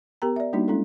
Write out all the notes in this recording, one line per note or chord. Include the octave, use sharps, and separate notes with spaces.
B3 G4 A#4 G5 A#5
D5 E5
G3 A#3 D4 D#4 F#4
G#3 C#4 E4 A4